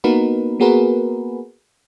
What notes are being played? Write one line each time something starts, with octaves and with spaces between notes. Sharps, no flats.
A#3 B3 D#4 F#4 A#4 B4
A#3 B3 F#4 G#4 A#4 B4